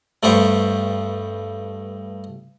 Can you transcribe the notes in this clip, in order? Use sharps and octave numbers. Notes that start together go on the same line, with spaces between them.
G2 A3 B3 G4 C5 C#6